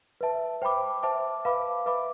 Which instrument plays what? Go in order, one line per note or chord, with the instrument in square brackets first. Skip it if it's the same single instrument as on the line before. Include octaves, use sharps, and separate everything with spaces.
[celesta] B4 E5 A5
C5 G5 B5 D6
C5 E5 A5 D6
B4 F5 B5 D6
B4 E5 B5 D6